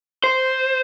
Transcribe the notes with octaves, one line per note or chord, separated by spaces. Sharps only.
C5